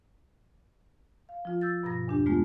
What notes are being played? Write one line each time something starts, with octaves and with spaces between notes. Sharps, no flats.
F5
F3 F4
E6 G6 A6
G2 B2 F3 A#5 A#6
E2 D4 G4
G#3 A3 B3 F4